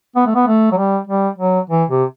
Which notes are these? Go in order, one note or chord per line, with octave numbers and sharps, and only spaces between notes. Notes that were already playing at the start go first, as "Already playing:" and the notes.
B3
A3
B3
A3
F#3
G3
G3
F#3
E3
C3